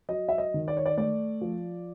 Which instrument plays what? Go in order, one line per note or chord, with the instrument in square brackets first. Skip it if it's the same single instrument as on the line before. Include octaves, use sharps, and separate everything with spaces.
[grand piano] F#3 D#5
E5
D#5
D#3
D5
C#5
D5
A3 D5
F3